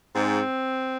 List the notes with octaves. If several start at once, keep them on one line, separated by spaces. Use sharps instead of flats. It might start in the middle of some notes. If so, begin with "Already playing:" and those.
G#2 C4